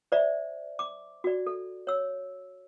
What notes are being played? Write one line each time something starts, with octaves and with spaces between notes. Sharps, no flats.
C5 D5 E5
D6
F#4 D5
A4
C#5 E6